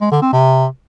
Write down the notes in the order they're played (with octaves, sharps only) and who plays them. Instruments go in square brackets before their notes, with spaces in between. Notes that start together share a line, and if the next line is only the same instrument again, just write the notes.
[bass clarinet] G#3
D3
C4
C3